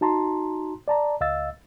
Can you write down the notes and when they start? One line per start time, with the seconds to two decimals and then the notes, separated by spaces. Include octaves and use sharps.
0.01 D#4 F#4 A5 A#5 C6
0.88 D5 A5 A#5
1.21 C#2 D#5 F5 E6 A6